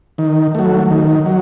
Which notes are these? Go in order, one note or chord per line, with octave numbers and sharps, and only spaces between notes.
D#3
F#3 A3
D#3
F#3